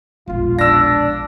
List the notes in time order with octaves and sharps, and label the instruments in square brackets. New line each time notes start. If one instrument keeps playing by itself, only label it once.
[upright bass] E1 A#1 [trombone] F4
[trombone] D4 [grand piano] E6 A#6